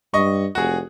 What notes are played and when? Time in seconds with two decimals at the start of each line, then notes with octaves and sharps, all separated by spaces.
0.14 G2 D#5 C#6
0.55 F1 F#4 G#4